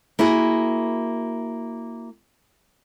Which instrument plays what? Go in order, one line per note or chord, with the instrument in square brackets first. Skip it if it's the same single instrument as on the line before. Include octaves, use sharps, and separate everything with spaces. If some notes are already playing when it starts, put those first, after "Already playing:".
[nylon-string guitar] A#3 E4 F#4 G#4